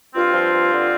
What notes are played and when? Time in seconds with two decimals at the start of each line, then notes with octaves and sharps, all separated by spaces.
0.13 G2 C4 F4
0.32 F3
0.51 G2
0.71 D3